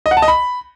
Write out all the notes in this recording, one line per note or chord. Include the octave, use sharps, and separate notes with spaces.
D#5
F#5
A5
D#5
B5